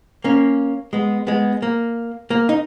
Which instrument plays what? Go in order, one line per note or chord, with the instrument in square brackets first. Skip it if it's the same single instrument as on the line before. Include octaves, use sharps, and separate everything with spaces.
[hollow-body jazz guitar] A#3 C#4
G#3 B3
G#3 B3
A#3
A#3
D#4